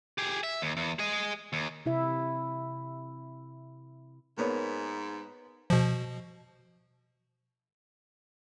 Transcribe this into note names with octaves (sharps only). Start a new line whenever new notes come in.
G4 G#4
E5
D#2
E2
G#4 D#5
D#2
C3 E4 E5
G#2 A#3 B3 C#5
B2 F3